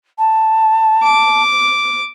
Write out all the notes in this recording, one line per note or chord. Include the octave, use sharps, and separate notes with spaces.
A5
D6